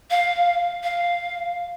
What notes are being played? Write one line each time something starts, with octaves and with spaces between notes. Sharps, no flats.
F5
F5